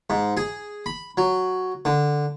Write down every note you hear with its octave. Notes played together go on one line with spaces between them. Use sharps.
G#2
G#4
B5
F#3
D3